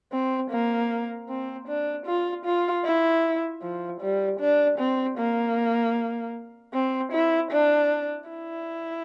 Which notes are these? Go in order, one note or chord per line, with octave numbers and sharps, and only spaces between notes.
C4
A#3
C4
D4
F4
F4
E4
F3
G3
D4
C4
A#3
C4
E4
D4
E4